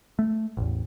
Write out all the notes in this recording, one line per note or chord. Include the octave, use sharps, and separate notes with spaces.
A3
A1 E2